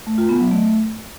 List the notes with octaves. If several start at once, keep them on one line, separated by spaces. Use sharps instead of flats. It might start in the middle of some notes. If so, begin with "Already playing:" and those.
A3
F4
B3
F#3
A3